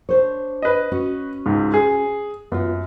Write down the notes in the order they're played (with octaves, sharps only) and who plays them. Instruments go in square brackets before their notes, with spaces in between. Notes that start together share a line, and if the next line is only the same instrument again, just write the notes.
[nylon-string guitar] D4 C5 C#5
[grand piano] B4 D#5
[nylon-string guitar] C#4 F#4
[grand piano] C#2 G#2
G#4
[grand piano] F#2 [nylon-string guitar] B3 F4